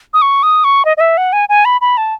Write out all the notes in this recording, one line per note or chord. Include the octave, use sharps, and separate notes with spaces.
D#6
C#6
D#6
C#6
D#5
D#5
E5
F#5
G#5
G#5
B5
B5
A5